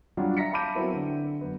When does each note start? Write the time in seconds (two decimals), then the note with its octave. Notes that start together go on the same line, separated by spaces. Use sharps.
0.17 F#3 G3 D4 F4 F#4
0.37 E5 A#5 A#6 B6 C#7
0.53 F5 A5 B5 D6 G6 D#7
0.75 F#3 B3 C4 E4 A#4
0.93 D3
1.41 F#2 B3